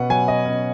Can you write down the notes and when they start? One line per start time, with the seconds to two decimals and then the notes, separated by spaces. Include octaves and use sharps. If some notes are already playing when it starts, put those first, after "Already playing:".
Already playing: B2 C#4 B4 F#5
0.10 F#3 G#5
0.28 D#5
0.45 C#4